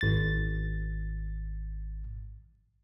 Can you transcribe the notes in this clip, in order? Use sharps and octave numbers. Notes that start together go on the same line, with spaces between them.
G#1 A6